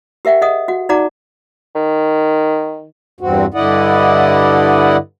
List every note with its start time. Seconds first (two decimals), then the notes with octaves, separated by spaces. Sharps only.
0.25 G4 A#4 E5 F#5 G5
0.42 G#4 D#5 F#5 D#6
0.68 F#4 F#5
0.89 D#4 F#4 D5 F#5 A#5 D6
1.75 D#3
3.20 E2 G2 C4 F#4
3.54 G2 D3 E4 D5 D#5 F#5